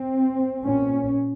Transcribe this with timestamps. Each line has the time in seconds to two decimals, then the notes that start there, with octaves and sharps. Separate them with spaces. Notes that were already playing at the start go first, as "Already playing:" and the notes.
Already playing: C4
0.63 A#2 C#4